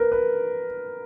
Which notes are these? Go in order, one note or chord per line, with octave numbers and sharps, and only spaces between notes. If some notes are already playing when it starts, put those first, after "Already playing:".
Already playing: A#4 B4
B4